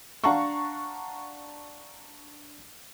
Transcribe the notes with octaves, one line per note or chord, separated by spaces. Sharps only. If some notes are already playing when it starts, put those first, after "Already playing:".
D4 F5 F#5 A5 A#5 C#6